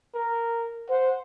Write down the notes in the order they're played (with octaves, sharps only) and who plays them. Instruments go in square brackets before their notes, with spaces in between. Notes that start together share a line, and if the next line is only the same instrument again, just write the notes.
[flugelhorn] A#4
[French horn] C5 [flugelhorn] F#5